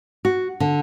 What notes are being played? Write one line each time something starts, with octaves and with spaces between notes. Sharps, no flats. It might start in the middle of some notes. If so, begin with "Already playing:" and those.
F#4
D3